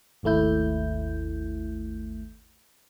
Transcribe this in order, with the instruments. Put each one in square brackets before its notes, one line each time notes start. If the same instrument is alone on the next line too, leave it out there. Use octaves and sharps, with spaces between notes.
[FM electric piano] G#1 D#2 A3 E4 G6